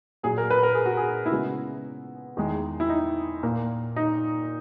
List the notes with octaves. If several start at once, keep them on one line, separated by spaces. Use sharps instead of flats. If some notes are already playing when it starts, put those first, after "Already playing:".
A#2 F#3 A#3 G#4
A#4
B4
A#4
G#4
F#4
G#4
E4
C#3 G#3 B3 F#4
E2 D#3 G#3
E4
D#4
A#2 A#3
D#4